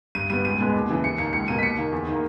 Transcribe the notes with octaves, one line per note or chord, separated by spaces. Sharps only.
G2 D#7
G3 B3 D#7
C#2 D#7
B2 G#3 B3
D#2
C#3 E3
D#2 C#7
D#3 A#3 C#7
C#2 C#7
B2 A#3 D#7
B6
D#2 C#7
D#3 A#3
E2
D#3 A#3